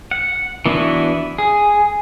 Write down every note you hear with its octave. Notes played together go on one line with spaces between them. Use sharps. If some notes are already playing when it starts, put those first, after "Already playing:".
F#5
E3 B3 D4 E4 F#4
G#4